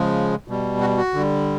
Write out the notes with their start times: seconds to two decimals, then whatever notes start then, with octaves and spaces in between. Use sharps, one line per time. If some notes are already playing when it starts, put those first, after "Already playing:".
Already playing: C#3 F3 G#3
0.48 B2 G3
0.81 F#4
0.97 F#4
1.14 D3 G3